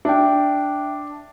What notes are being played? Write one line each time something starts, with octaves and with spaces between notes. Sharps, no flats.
D4 E5 G5